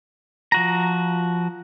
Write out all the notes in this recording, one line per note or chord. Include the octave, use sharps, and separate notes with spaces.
F3 F#4 A#5